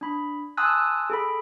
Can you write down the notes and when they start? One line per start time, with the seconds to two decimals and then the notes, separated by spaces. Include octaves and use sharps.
0.01 D4 B5
0.57 G#5 A5 C6 D#6 E6 F#6
1.10 G#4 A4 B5